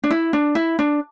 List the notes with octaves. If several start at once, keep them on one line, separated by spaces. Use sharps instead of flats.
D4
E4
D4
E4
D4